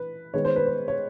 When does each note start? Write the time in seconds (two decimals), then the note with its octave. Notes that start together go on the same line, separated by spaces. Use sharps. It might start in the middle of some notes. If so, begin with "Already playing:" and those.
Already playing: E3 B4
0.34 D#3 G#3 B3 C#5
0.45 C5
0.56 B4
0.67 C5
0.88 C#5